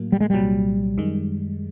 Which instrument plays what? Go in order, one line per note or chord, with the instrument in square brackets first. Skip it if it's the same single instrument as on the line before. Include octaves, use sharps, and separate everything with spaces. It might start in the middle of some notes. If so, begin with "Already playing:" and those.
Already playing: [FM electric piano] A2 F#3 A#3
[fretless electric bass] G3
G#3
[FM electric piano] C2 A#2 F#3 [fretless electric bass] G3
[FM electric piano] F#2 D#3 G#3